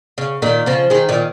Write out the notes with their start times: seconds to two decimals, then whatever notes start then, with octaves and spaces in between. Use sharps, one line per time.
0.18 C#3
0.42 A#2 D#3
0.66 C#3 F3
0.90 D#3 G#3
1.09 A#2 D#3